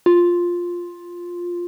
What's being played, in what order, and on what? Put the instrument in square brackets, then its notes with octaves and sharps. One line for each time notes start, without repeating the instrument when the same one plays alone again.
[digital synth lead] F4